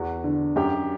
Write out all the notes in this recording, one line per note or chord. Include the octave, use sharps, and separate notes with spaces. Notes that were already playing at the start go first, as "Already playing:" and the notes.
Already playing: E2 F#4
D3
F#2 G4